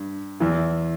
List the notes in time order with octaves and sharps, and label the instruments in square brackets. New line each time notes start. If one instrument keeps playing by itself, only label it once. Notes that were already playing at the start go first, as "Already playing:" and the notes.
Already playing: [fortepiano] G2
E2 E3